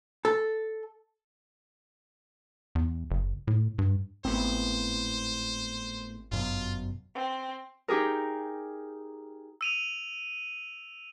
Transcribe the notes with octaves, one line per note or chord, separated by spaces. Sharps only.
A4
E2
F#1
A2
G2
G#1 A2 B3 C4 C5
G1 F#2 B2 F4
C4
D#4 G4 G#4 A#4
E6 D#7 F7